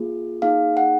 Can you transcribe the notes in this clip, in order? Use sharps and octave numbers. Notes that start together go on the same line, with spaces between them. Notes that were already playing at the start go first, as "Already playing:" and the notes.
Already playing: A#3 F4 G#4
A#3 D#4 G#4 F5
F#5